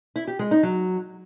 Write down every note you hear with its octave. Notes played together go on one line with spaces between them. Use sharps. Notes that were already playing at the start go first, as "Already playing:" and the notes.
E4
G4
G#3
D#4
F#3